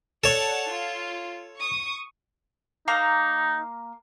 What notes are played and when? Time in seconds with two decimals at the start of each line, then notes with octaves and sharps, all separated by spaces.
0.24 A4 C#5 D5 F#5 A5
0.67 F4
1.56 C#6 D#6
2.88 A#3 D#4 F5 A#5